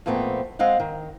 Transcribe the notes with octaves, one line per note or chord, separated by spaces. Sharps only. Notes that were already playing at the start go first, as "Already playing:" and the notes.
F2 A#2 A3 B3 C4
G#3 C4 D#5 F5 F#5
D#3